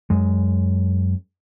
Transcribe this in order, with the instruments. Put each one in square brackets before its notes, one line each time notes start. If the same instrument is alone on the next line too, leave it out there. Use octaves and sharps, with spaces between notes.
[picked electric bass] F#2 G#3